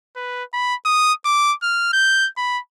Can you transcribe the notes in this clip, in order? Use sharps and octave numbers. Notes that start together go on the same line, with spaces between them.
B4
B5
D#6
D6
F6
G6
B5